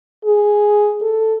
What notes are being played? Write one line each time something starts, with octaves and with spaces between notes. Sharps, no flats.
G#4
A4